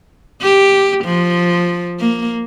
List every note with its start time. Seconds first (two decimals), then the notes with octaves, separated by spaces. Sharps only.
0.42 G4
1.05 F3
2.00 A#3